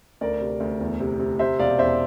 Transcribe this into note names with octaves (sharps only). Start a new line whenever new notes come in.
D2 A#4 D5
C3
D2
E2
C3
C3
C3 C5 E5
E1 D5 F5
E2 C5 E5